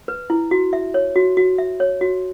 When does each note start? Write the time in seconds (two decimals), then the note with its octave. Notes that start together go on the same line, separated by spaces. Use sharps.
0.08 B4
0.30 E4
0.51 F#4
0.73 E5
0.94 C#5
1.16 F#4
1.37 F#4
1.58 E5
1.80 C#5
2.01 F#4